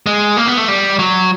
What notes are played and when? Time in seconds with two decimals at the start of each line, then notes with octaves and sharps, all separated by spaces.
0.06 G#3
0.37 A#3
0.47 B3
0.57 A3
0.68 G3
0.99 F#3